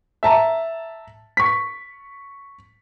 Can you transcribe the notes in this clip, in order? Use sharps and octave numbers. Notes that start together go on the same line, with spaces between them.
E5 A5 A#5
C#6 B6